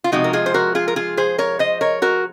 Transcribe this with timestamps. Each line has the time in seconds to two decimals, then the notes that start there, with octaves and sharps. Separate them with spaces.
0.04 F4
0.12 C3 F3 G#3 D#4 F#4
0.24 A#4
0.33 F4 G#4
0.46 C5
0.54 F#4 A#4
0.75 F4 G#4
0.88 A#4
0.96 F4 G#4
1.17 G#4 C5
1.38 A#4 C#5
1.59 C5 D#5
1.81 A#4 C#5
2.02 F#4 A#4